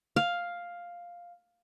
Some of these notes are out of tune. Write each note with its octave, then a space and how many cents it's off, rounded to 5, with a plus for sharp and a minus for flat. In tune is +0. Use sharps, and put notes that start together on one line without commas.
F5 +5